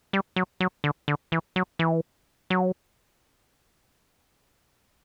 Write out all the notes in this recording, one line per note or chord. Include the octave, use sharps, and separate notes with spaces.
G3
F#3
F#3
D3
D3
E3
F#3
E3
F#3